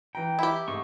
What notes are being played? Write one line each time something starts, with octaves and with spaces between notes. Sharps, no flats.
E3 G5 A#5
E4 G4
G#2 A3 C#6